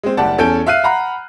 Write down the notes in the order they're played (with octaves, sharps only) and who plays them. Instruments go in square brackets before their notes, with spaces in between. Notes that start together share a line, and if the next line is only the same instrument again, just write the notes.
[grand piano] G#3 C4
F#1 G3 G4 D5 F#5 A5
E2 C#4 A4 G#5 G6 D7
E5 F5 F6 F#6 C7 D#7
F#5 A#5 B5 F#6